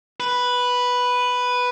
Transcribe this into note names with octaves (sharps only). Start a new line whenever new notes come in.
B4